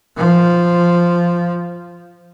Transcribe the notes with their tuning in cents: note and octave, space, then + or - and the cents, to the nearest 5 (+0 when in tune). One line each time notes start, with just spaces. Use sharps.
F3 -5